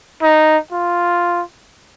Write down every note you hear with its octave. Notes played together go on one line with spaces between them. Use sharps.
D#4
F4